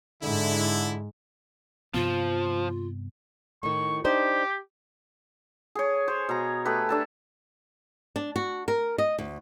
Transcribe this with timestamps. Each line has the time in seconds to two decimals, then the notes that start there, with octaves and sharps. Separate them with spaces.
0.23 G#2 D3 E4
1.94 G2 C3 F3 B3 F4
3.63 A2 D#3 C#6
4.04 D4 D#4 G4 C5
5.75 G#4 C#5
6.08 C5 C#5
6.29 B2 A#5
6.65 A3 G4 B4
6.89 D4 A4 A5
8.16 D4
8.36 F#4
8.68 A#4
8.98 D#5
9.18 D2